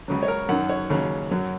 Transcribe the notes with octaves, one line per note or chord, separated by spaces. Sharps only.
C#2 C#3 F#3
C#5
A#4
F#2 D#3 F#3 F#5
C#5
D#2 C#3 F#3
F#2 F#3